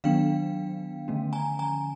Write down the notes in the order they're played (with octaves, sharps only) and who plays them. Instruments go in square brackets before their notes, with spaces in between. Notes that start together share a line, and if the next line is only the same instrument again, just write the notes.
[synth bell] D#3 F#3 B3 D4 F5 G5
D3 F3 A3 C#4
G#5 A#5
G#5 A#5